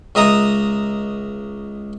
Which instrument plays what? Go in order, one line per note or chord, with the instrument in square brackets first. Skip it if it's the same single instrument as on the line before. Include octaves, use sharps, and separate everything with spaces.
[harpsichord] C#2 D#5 E5 A#5 D#6